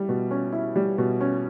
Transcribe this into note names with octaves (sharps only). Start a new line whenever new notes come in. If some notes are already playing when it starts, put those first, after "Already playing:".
Already playing: G3 E4
B2
C#4
E4
G3
B2
C#4